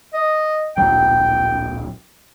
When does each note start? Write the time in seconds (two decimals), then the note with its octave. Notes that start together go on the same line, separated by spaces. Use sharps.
0.13 D#5
0.77 D1 A#1 F#3 G5